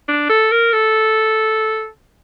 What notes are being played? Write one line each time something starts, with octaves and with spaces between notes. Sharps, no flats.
D4
A4
A#4
A4